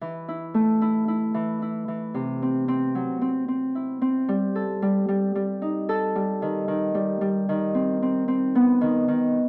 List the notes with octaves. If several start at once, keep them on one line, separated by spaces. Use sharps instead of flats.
E3
E4
A3
E4
E4
E3
E4
E3
C3
C4
C4
F#3
C4
C4
E4
C4
G3
A4
G3
G3
G3
D#4
A4
G3
D#3
D#3
G3
G3
D#3
C4
C4
C4
B3
D#3
D#3